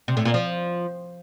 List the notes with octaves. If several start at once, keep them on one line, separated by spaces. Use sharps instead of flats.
C3
A2
A#2
F3